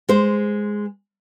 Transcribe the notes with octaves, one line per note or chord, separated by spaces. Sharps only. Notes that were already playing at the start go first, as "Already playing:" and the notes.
G#3 C5